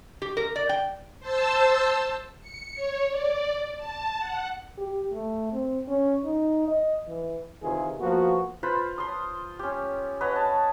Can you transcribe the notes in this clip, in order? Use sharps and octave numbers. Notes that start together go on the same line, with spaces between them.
G4
A#4
D5
G5
C5 A5 E6
C#7
C#5
D5
A5
F#5
G4
A3
C4
C#4
D#4
D#5
E3
C3 D#3 E3 F4 G#4
F3 A#3 B3 F#4
F4 B4 C5 B5
C6 D#6
C#4 G4
B4 C#5 D#5 F#5
A5